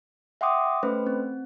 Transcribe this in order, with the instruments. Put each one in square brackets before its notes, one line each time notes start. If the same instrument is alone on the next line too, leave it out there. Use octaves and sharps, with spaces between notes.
[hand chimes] E5 F#5 G5 C6 D6 D#6
A3 C#4 B4 C5
C4